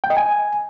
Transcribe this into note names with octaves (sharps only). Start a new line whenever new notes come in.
G5
D#5
G#5